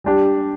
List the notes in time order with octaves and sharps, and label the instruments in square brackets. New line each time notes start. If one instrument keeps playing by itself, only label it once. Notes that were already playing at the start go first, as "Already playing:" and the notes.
[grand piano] G3 D4 G4